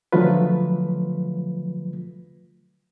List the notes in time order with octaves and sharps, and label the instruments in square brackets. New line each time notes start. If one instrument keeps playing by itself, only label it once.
[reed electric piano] D3 F3 F#3 A3 F4 B4